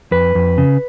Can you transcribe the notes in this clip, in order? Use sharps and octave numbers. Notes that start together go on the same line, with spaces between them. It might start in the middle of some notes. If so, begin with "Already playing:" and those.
F2 B4
F2
C#3